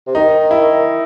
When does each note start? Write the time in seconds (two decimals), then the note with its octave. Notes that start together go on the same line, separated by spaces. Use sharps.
0.07 C3
0.15 D#3 D#4
0.51 E4